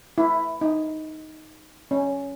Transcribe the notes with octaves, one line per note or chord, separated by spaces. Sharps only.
E4
D#4
C#4